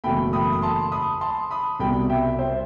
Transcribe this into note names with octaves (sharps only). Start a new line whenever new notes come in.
F#1 E2 B2 A3 G5 B5
B5 D#6
D#6
A5 C6
B5 D#6
A5 C6
B5 D#6
C2 B2 G3 G5 B5
E5 G5
C5 E5